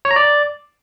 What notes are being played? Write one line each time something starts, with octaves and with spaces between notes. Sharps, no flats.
C#5
A#5
D5